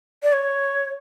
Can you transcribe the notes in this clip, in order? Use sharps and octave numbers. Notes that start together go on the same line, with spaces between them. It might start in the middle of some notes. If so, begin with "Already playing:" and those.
D5
C#5